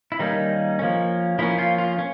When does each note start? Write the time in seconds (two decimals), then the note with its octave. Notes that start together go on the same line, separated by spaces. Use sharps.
0.12 E4
0.19 D#3 G3 A#3 C#4 D#4
0.79 F3 A#3 C#4
1.39 F3 A#3 C#4 E4
1.59 F4
1.78 F4
1.99 C#4